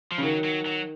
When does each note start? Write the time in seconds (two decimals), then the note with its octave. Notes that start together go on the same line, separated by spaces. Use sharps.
0.12 F3
0.18 C#3
0.23 D#3 F#3
0.44 F#3
0.66 F#3